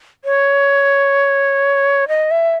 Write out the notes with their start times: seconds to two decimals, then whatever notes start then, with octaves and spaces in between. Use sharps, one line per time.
0.25 C#5
2.08 D#5
2.31 E5